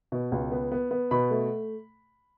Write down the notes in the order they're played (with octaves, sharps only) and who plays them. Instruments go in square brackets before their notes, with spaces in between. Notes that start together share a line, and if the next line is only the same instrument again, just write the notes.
[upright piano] B2
C#2
B3
B3
B3
B2 B5
A3